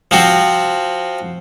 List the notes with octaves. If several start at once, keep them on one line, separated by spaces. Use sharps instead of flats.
F3 C4 F#4